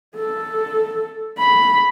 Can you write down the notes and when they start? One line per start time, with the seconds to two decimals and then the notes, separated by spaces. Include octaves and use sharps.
0.16 A4
1.39 B5